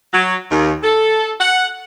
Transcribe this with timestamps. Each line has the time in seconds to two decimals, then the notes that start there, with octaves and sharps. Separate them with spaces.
0.13 F#3
0.50 D#2
0.83 A4
1.40 F#5